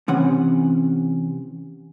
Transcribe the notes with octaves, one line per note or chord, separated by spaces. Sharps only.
C3 E3 C#4 F#5